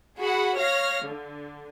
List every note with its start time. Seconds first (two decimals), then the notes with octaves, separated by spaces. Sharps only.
0.19 F#4 G#4 F#5 B5
0.56 C#5 F5 F6 A#6
1.06 D3